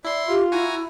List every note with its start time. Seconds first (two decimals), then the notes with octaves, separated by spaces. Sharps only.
0.04 E4 D5 C6
0.28 F4 G4
0.52 E4 F#4 G#5 A#5